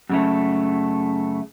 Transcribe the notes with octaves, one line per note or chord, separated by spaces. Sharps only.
F#2 C#3 A3